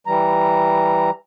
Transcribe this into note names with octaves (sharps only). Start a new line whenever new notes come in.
E3 G3 A#5